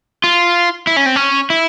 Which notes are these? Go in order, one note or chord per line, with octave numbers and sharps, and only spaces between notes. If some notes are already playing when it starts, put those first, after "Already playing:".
F4
E4
C#4
C4
C#4
E4